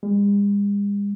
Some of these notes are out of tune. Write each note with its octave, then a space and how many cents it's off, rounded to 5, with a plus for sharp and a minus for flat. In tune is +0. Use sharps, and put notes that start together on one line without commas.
G#3 -45